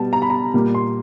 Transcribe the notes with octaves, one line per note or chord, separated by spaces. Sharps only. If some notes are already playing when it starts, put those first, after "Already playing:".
Already playing: B2 G3 B3 A5
A#5
B5
A#5
A#2 G3 A#3
C6